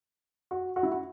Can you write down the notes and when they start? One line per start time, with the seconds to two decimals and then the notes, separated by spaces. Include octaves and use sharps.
0.51 F#4
0.76 F#4
0.83 E4
0.91 F#4